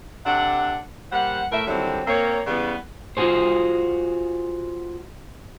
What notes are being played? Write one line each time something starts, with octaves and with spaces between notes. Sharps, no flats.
C3 D4 A4 F#5
G3 A#3 C5 F#5
A2 A#4 E5
D3 D#3 F#3 G3 C4 E4
A#3 C4 C#5
C#3 E3 G3 B3
F4 F#4 G#4 C5